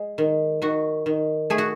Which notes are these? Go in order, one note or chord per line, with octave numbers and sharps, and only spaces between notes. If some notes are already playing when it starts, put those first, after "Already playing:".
Already playing: G#3
D#3
D#3 F#4
D#3
A3 G#4
F#4